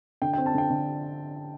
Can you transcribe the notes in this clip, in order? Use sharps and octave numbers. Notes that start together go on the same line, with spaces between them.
D3 G5
G5
C4
A5
D3 G5
D3